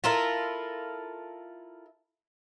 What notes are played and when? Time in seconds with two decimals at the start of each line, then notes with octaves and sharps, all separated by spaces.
0.04 E4 F4 A4 A#4